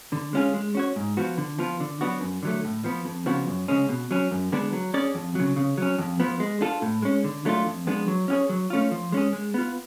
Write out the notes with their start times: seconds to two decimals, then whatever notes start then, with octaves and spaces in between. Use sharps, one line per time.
0.12 D3
0.33 G#3 C#4 F4 G#4
0.54 G#3
0.75 C#4 F#4 C#5
0.96 G#2
1.17 F3 B3 F#4
1.38 D3
1.59 F3 B3 F4
1.80 D3
2.01 F#3 B3 D4 F#4
2.21 F#2
2.43 D3 F#3 A3
2.64 A2
2.84 F3 B3
3.05 F2
3.26 C#3 F3 B3 F#4
3.48 F#2
3.68 C#3 G#3 C#4
3.89 B2
4.11 F#3 C#4
4.31 F#2
4.52 D3 G#3 B3 D4
4.73 F#3
4.94 C#4 G#4 D5
5.15 F2
5.35 C#3 F#3
5.56 C#3
5.78 F#3 C#4
5.98 F2
6.20 F3 B3
6.40 G#3
6.61 D4 F4 A4
6.82 A2
7.03 G#3 C#4
7.24 D3
7.45 F#3 A3 D4 F4
7.66 F2
7.87 F3 G#3 B3 D4
8.08 F#3
8.28 C#4 F4 G#4 C#5
8.49 F#3
8.70 A3 C#4 F4
8.91 F3
9.12 G#3 C#4 G#4
9.33 G#3
9.54 B3 F4